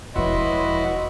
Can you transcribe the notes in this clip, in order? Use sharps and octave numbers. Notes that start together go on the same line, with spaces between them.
E1 F3 E4 F#4 B4 C#5 D#5 C6